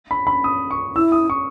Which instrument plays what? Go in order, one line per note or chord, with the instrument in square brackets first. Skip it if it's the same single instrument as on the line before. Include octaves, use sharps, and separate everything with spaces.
[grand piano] B5
B5
D#6
C#6
[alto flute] E4 [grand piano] E6
[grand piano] D#6
C#6